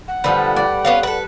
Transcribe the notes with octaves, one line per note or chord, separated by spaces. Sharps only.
F#5
D3 F3 G3 A4 B4
D5
B3 C#4 F4
A4 B4